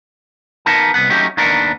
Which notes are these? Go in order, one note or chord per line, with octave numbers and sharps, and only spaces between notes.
B3 D#4 A#4 A5
C2 F#2 B3 F#5
F#3 A3 C#4 D#4 G4
D#2 D#3 B3 D4 A#4